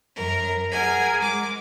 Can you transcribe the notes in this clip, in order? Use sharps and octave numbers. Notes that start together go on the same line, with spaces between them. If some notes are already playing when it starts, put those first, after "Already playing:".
F#2 A#4
G#4 A#4 F#5 G#5
G#3 D6